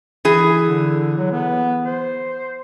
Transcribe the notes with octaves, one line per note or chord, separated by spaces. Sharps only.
E3 G#4
D3
F#3
B3
C5